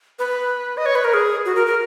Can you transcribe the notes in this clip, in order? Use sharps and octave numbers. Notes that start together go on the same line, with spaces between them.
B4
D#5
C#5
B4
A#4
G#4
F#4
A#4
A#4